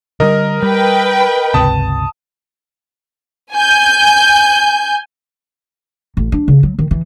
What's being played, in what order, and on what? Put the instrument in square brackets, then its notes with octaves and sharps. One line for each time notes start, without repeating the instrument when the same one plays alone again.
[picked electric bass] D3 D#3 G3 [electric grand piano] A#4 D#5
[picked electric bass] G3 [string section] B4 G5
[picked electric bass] G1 C#2 C3 [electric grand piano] A5 D#6
[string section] G#5 G6
[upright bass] A1
D4
C#3
F#3
D#3
E3